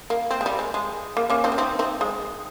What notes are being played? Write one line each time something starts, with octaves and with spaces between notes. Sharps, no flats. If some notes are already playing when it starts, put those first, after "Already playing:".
A#3
C4
G#3
G3
G#3
G#3
A#3
A#3 C#4
C4 D#4
C#4
C4 D#4
C4 D#4
G#3